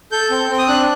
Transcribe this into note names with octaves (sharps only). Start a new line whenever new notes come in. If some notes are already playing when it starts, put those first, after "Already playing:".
A4 G6
C4
C4
D#6
D4 F#6